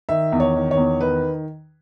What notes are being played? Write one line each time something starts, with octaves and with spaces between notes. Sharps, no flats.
D#3 E5
E2
C#5
D#3
C#5
E2
D#3 B4